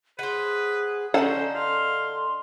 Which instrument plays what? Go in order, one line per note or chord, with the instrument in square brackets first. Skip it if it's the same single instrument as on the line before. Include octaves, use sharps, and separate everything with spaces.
[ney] G#4 [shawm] B4 [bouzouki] C5 F#5
[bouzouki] D3 D#4 [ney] C#4 [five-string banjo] A4 F#5 [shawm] C5
[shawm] F5 [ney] C6